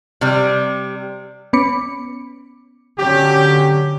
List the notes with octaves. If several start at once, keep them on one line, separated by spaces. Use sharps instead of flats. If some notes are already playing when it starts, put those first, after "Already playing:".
C3 G3
B3 C#4 B5 D6 C#7
D3 F#3 C#4 G4